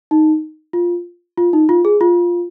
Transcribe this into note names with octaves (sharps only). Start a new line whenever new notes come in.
D#4
F4
F4
D#4
F4
G#4
F4